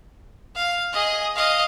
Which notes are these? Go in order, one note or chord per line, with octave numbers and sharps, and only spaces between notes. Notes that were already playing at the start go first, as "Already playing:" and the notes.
F5
G#4 D#5
D#5 F5